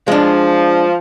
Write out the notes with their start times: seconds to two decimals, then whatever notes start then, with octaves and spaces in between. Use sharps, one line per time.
0.08 F3 G#3 D4